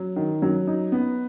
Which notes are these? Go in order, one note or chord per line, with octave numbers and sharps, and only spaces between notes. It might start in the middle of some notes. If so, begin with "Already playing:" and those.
Already playing: F#3
D#3
F#3
D#4
B3